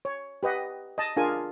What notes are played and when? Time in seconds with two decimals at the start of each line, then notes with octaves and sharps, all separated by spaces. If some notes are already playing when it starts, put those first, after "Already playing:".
0.05 C#5
0.43 G4 B4 D#5 F#5
0.98 D#5 A5
1.16 D4 F4 G#4 A#4 G#5